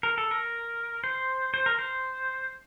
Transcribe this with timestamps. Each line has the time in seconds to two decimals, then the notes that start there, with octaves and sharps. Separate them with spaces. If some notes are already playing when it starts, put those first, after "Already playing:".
0.03 A#4
0.18 A4
0.31 A#4
1.04 C5
1.54 C5
1.66 A#4
1.79 C5